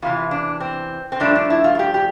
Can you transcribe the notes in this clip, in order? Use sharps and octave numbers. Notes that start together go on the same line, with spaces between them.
E2 C3 E3 F4
D4
C4
C4
G2 F3 A3 D4
D4
E4
F4
F4
G4
G4